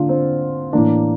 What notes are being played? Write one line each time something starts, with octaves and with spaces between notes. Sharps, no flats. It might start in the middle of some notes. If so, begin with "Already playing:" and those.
Already playing: D3 A#3 D4 F4
C4
A2 E3 A#3 D4